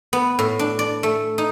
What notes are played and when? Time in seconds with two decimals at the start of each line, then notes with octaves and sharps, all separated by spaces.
0.13 B3
0.39 A2
0.59 D4
0.79 D5
1.03 A3
1.38 D#4